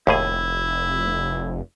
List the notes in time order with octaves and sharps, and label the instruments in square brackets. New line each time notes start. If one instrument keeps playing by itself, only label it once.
[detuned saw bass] F1 [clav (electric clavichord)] D#2 A2 G#4 [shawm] E4